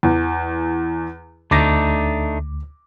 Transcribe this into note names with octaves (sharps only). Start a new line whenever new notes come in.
E2
D2 A3 D4 D#4 D6 A#6